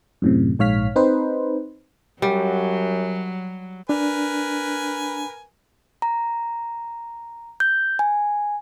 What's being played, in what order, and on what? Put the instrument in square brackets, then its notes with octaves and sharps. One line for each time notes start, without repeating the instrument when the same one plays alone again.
[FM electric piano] F#2 A2 C3
A#1 G#2 C#5 F5 F6 B6
C4 D#4 B4 C5
[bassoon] F#2 [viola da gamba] F#3 [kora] G3
[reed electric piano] D4 [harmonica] A#4 B4 G#5
[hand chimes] A#5
G6
G#5